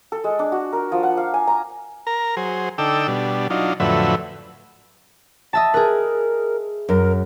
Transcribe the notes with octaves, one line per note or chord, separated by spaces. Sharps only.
A4
G#3
D4
F#4
A#4
F3
F#5
F5
G#5
A#5
A#4 A#5
F#3 G#4 C5
D3 D#4 A4 G5 D6 E6
B2 G3 D4
F#3 D4 D#4 F4
F2 A2 D3 F#3 B4 E5
D#5 E5 A5
G#4 A#4 B4
F#2 A#4